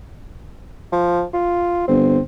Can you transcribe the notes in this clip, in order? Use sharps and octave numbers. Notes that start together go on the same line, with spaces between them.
F3
F4
G1 C4